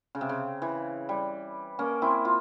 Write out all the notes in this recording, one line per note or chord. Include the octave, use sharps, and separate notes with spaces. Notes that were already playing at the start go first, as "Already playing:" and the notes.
C#3
C3
C#3
E3
G3
A#3 C#4
C4 E4
F4